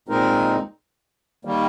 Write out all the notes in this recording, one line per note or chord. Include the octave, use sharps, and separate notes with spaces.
A#2 G#3 C4 D#4 A#4
D#3 G3 A#3